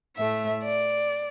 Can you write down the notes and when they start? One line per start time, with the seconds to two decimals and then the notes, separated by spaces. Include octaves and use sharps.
0.17 A2 A3 E5
0.63 D5